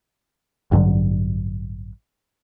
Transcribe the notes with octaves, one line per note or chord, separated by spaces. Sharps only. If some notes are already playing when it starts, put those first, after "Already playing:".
A1 G2 D3 F#3